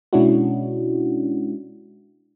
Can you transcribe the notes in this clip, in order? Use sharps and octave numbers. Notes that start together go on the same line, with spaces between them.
B2 G#3 C#4 D4 E4 F#4